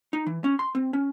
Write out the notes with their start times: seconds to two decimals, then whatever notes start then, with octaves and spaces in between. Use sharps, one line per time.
0.13 D#4
0.27 E3
0.44 C#4
0.59 C6
0.75 C4
0.93 C#4